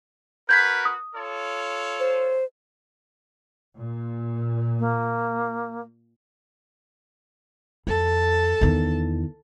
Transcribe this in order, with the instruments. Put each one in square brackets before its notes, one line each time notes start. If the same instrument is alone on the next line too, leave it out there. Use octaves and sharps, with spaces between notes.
[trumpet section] F#4 A#4 B4 [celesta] G6 G#6 B6
[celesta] D#6
[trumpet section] F4 A4 C#5
[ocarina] C5
[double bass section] A#2
[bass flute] A#3
[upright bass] F2 [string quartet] A4 A5
[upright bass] E2 D#3